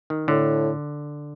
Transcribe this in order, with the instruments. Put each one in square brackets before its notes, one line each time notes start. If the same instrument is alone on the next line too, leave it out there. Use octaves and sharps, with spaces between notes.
[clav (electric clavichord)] D#3
[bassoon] A2 [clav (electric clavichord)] D3